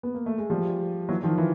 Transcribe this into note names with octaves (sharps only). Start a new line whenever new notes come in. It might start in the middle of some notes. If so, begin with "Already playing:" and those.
B3
A#3
A3
G#3
F3 G3
E3 F#3
D#3 F3
E3